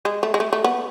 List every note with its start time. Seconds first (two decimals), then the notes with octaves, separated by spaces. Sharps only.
0.05 G#3
0.23 A3
0.34 G#3
0.40 A3
0.53 A3
0.64 B3